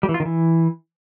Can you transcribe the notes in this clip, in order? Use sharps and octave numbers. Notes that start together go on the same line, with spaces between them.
G3
E3
F4
D#3
E3